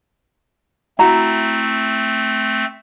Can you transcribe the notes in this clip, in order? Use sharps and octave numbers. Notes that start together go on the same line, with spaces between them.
A3 C4 E4 F#4 A#5